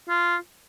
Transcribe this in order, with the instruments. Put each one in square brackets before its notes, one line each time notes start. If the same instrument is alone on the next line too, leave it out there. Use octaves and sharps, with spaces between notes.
[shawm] F4